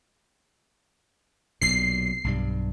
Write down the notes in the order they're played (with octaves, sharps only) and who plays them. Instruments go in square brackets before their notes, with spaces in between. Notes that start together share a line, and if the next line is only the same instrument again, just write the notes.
[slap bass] B1 A#2 [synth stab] C7
[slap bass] B1 G2 G3